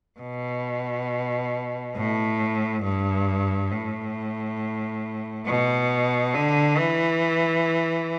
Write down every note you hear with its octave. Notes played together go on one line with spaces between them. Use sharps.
B2
A2
G2
A2
B2
D3
E3